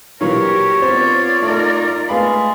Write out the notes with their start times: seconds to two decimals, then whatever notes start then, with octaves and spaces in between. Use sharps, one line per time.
0.21 A#2 E3 F#3 G4 A#4 C#5
0.82 B3 C4 F4 C5 D5
1.42 A3 D#4 A#4
2.09 G#3 A3 B3 F5 B5